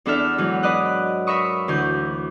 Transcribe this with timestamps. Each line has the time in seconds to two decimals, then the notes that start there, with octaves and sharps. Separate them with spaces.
0.06 E2 D4 A4 E5 F6
0.38 G#2 E3 F#3
0.63 B4 D5 D#5 F#6
1.27 A#4 E5 B5 C#6 D#6
1.68 D2 E3 G6